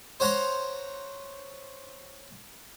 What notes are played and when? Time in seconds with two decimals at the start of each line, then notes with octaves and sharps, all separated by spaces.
0.20 C5 C#5 F#5 A#5 C6